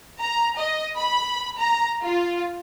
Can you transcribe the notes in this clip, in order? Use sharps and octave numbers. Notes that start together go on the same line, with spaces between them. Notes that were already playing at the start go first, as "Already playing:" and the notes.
A#5
D#5
B5
A#5
F4